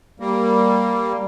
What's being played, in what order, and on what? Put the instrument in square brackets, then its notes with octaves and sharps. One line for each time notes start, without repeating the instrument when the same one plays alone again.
[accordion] G3 A#3